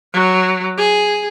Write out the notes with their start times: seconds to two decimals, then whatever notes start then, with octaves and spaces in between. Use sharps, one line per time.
0.14 F#3
0.78 G#4